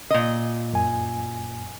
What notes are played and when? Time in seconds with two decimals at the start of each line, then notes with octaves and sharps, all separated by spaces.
0.10 A#2 D#5
0.73 F#2 G#5